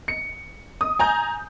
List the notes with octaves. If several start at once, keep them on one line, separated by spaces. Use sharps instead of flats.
C#7
D#6
G#5 A#5 G6